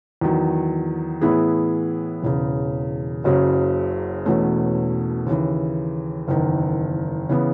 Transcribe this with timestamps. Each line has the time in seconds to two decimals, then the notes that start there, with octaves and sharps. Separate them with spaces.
0.21 E2 D#3 F#3
1.21 A2 E3 B3 E4 G#4
2.23 E1 E2 C#3
3.24 F#1 F#2 C#3 F#3
4.25 E1 E2 B2 A3 C#4
5.26 D#2 C#3 E3
6.28 F#1 E2 D#3
7.29 C#3 E3 B3